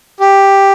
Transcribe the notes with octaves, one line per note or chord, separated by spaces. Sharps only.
G4